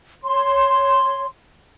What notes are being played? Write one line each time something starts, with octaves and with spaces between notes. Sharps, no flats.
C#5 C6